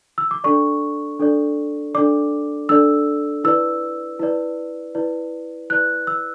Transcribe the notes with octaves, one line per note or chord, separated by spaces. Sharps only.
E6
D6
D4 A4 D5 C#6
D4 A4 D5
D4 A4 D5 D6
D4 A4 D5 E6
E4 B4 D5 E6
E4 B4 D5
E4 B4 D5
E4 B4 D5 F#6
E6